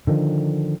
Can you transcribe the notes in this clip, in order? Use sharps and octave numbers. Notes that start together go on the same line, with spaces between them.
D3 D#3 F3